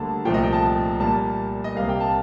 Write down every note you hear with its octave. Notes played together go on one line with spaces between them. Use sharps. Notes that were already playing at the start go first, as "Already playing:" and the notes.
Already playing: D2 D3 G3 A#3 A5
C2 A#2 F3 A3 G5
D#5
G5
A5
A#2 G3 A#3 A5
D#5
C2 C3 G3 A#3 F5
G5
A5